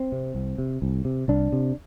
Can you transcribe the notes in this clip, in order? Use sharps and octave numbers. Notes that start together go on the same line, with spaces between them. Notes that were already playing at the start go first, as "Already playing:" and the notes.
Already playing: C4
C3
C2
C3
C2
C3
C2 D4
C3